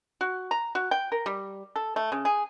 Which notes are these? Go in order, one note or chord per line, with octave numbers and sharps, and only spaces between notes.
F#4
A#5
F#4
G5
A#4
G3
A4
A3
C#3
G#4